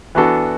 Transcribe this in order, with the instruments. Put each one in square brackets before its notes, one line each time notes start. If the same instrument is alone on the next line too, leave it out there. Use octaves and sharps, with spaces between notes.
[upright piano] E3 B3 D4 F#4 A4